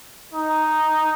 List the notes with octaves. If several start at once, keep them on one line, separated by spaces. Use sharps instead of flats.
D#4